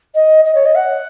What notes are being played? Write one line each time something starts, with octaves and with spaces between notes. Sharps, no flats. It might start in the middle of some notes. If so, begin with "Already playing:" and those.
D#5
D#5
C#5
D#5
F#5